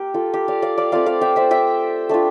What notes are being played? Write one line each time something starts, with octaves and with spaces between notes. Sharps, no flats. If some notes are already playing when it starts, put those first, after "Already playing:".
Already playing: A#3 G4
F4 A4
G4
D5 F5
D5 F5
D5 F5
A3 C4 F4 D5 F5
D5 F5
E5 G5
C5 E5
E5 G5
A3 D4 F4